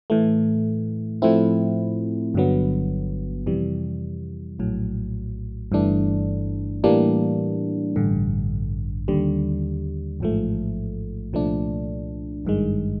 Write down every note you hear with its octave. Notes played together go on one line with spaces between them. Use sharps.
A2 E3 A3
A2 F3 A3 C4 E4
G1 G2 D3 F#3 B3
F2 C3 E3 G3
A#1 A2 F#3
G1 G2 E3 A3 D4
A2 E3 G3 A#3 D4
A1 G2 D3
D#2 D3 G3
A1 G#2 F3 A3
C2 A#2 F3 A3 D4
G#1 G2 D#3 G#3